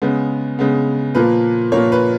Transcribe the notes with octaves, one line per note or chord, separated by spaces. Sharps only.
C#3 G#3 B3
C#3 G#3 B3
A#2 F3 A#3 B4
A#2 F3 A#3 C#5
B4